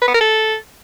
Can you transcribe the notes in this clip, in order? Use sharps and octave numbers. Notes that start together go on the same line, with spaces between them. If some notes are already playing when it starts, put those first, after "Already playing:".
B4
B3
A#4
A4